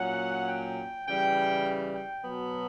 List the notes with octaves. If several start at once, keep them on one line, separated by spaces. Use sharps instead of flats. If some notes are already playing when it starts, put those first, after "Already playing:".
Already playing: A#2 F#3 C#4 F#5
G5
C#3 E3 G3 G5
G5
B2 F#3 B3